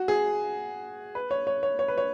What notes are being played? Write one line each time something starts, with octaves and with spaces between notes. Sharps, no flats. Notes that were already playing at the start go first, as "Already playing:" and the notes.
Already playing: F#4
G#4
B4
C#5
C#5
C#5
C#5
B4
C#5